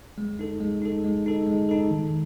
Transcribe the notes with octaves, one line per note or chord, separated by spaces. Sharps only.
G#3
D#4 A4
G#3
D#4 A4
G#3
D#4 A4
G#3
D#4 A4
D#3